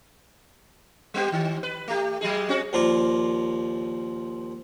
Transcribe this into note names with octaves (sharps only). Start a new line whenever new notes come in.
G3 B3 G4
D#3
B4
A3 G4
F#3 G#3 G#4
C4 C#4 F#4
D#2 F3 F4 A#4 D5 A#5